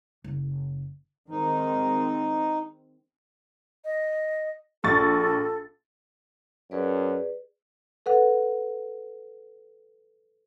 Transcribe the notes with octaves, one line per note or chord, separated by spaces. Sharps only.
F#1
D#3 G#3 C4 D#4
D#5
A#1 A4 C#6 A6
F#2 G#4 B4 D5
A4 B4 F#5